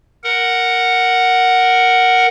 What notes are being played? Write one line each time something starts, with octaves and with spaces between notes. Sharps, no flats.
A#4 F#5